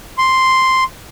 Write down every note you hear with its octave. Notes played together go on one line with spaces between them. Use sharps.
C6